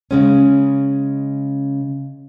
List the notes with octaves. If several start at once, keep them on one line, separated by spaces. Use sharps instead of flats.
C#3 G#3 C#4